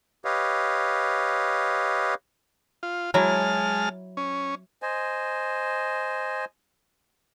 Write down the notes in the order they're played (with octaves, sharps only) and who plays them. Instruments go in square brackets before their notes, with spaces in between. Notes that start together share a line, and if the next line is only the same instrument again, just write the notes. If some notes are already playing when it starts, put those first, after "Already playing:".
[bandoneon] G4 B4 C#5 D#5 F5
[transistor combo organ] F4
[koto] F#3 E4 [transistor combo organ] G#3 A5 F6
[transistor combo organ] C#4
[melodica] C5 D#5 G#5